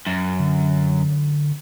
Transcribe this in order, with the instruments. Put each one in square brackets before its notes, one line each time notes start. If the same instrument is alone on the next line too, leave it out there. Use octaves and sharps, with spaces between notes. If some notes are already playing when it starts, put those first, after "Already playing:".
[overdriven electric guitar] F#2
[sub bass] D3